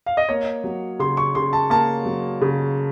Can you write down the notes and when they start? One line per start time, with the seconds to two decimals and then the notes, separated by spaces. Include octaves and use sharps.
0.06 F5
0.17 D#5
0.29 A#3 C#5
0.64 F#3
0.99 C#3 C6
1.17 C#6
1.35 C#3 C6
1.53 A5
1.70 A#3 A5
2.06 F#3
2.42 C#3